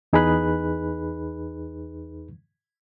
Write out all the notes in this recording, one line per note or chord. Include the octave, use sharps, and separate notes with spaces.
E2 D#4 G#4 B4 B5 F#6